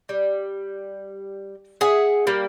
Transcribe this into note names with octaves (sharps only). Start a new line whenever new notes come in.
G3
G#4 E5 F#5
G3 A#3